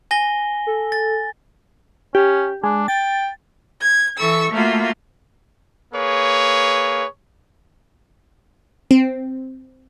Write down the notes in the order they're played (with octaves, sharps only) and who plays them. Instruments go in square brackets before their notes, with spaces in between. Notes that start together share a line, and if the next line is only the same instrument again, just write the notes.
[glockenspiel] G#5 A#6 G7
[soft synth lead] A4
[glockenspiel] A6
[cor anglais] C#4 [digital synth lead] G4
[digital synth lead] G#3 [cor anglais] D4
[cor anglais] G5 [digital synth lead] A6
[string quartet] G#6
E3 A4 C#6 E6
A3 A#3 F4 F#4
[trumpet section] A#3 G#4 B4 C#5
[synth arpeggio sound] C4